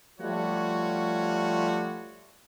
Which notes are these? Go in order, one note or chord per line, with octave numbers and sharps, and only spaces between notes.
F3 G3 A3 F4 F#4 C#5